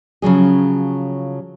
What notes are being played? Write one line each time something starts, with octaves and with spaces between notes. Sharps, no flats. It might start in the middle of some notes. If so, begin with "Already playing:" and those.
C#3 F3 F#3 G#4